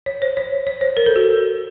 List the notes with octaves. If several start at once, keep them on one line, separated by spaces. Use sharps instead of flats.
C#5
C5
C#5
C#5
C5
A#4
A4
F#4